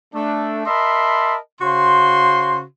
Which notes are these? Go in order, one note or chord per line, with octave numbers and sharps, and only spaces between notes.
A3 D4
A#4 D#5 E5 A5 B5 C6
C#3 F#4 C5 C6